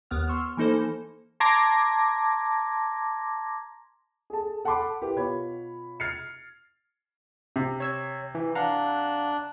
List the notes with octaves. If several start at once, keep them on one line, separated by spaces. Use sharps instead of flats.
D#2 B3 F#5 F6
C6 C#6 E6 F6
E3 A#3 D#4 A4 C5
A5 A#5 C6 D6 G#6 A#6
G#4 A4 A5
A4 F#5 A5 B5 C6 D6
E4 G4 A#4 B4
B2 F4 C#5 B5 G#6
F6 G#6 A6 C7 C#7
C3
C#5 E6 G#6
E3
D4 F5 F#5 A#5 F#6